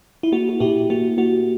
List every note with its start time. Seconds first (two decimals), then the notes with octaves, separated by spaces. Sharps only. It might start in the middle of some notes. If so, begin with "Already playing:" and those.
0.23 E4
0.32 A#3 F#4
0.49 F#4
0.60 A#2 E4 G4
0.90 A#3 F#4
1.17 A#3 F#4